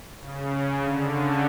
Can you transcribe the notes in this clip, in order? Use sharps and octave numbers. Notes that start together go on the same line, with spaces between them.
C#3
C#3
D3
C#3